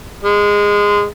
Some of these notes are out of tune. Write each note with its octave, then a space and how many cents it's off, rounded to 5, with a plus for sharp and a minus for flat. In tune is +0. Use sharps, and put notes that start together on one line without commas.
G#3 -15